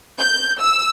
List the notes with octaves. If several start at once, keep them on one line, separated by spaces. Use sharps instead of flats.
G6
E6